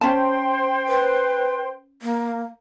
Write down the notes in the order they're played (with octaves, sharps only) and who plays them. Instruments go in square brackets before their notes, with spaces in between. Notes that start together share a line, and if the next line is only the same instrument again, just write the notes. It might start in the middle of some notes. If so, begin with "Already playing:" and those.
[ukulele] C#4 A5 [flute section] C5 G5 C6
[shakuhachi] B4
A#3